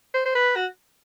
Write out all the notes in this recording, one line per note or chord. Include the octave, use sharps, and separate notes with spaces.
C5
C5
B4
F#4